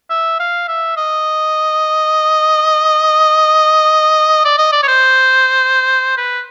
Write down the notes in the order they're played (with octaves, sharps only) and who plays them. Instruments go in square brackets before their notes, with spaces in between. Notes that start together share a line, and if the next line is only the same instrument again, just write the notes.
[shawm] E5
F5
E5
D#5
D5
D#5
D5
C#5
C5
B4